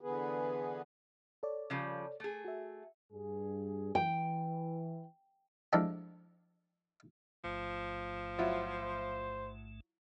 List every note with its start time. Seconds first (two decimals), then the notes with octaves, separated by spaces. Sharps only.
0.01 D3 E3 B3 G#4 B4
1.43 A4 C#5 D5
1.70 C#3 F3 G3
2.20 A3 G#4
2.45 F#4 E5
3.12 G2 G#4
3.95 E3 G5
5.73 F3 G#3 A3 D4 E4 G4
7.44 A1 G#2 F3 A3
8.39 F#3 E4 F4 C5